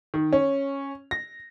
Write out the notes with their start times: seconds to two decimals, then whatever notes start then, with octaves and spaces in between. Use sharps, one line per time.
0.14 D#3
0.33 C#4
1.11 A#6